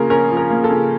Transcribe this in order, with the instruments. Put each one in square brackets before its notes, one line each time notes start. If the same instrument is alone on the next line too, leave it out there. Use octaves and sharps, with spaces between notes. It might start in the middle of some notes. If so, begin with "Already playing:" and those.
Already playing: [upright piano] C#3 F3 A#3 C#4 A#4
C#4 A#4
F3
A#4
A#3
A4
C#3